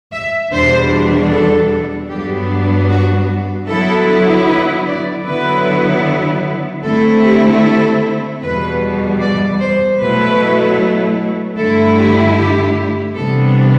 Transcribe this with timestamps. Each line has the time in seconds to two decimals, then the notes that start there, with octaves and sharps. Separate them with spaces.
0.13 E5
0.53 E2 B2 G3 D4 C5
1.32 A4
2.10 G2 F#3 B3 D4 G4
2.89 F#4
3.68 D3 F#3 B3 E4 A4
4.47 B4
4.86 D5
5.26 D3 F#3 B3 E4 B4
6.83 D3 A3 C4 E4 A4
7.24 G4
7.63 A4
8.42 E2 B2 G3 B4
9.21 D5
9.60 C5
10.00 B2 F#3 A3 E4 B4
11.57 G2 D3 A3 E4 A4
11.97 G4
12.36 G4
13.15 C3 E3 G3 B3 D4 A4